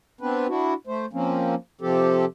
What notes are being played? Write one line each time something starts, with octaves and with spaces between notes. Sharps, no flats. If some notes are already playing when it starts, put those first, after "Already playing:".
B3 C4 D4 B4
D4 E4 F#4
A3 C5
F3 A#3 C4 C#4
C3 F3 C4 G4 A4